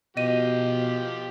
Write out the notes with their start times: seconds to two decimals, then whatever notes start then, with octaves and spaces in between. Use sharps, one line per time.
0.17 B2 F3 G4 D#5 D#7